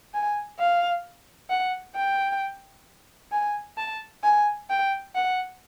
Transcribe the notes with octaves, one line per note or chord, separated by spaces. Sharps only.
G#5
F5
F#5
G5
G#5
A5
G#5
G5
F#5